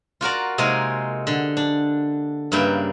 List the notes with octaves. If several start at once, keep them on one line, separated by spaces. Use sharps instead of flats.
F4 F#4 A#4 D5
C3 G#3 A#3 D#4 G#4 A#4
D3
D4
G2 C#3 A#3 B4 E5 G5